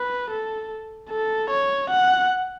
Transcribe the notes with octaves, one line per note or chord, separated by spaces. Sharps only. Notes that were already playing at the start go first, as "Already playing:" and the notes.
Already playing: B4
A4
A4
C#5
F#5